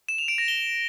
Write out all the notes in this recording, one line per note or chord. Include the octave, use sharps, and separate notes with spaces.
E7
F7
D7
A#6
G7